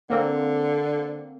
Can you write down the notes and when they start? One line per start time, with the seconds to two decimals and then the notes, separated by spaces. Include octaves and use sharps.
0.10 D3 A#3 C4